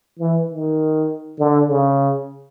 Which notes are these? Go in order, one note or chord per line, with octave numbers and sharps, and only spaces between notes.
E3
D#3
D3
C#3